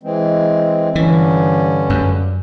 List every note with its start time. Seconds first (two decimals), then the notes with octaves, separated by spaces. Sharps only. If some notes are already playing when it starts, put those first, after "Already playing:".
0.03 E3 G#3 C4
0.95 G2 D3 E3 C#4
1.90 F#2